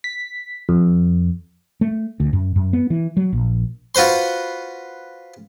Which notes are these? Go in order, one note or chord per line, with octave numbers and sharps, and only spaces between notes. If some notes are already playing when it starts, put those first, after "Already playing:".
B6
F2
A3
D2
F#2
F#2
B3
E3
F#3
A#1
F4 F#4 B4 C5 C6